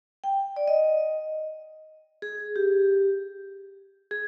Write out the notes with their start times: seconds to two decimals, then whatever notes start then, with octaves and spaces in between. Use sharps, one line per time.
0.24 G5
0.56 D5
0.68 D#5
2.22 G#4
2.56 G4
4.11 G#4